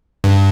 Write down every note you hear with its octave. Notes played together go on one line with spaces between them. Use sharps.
G2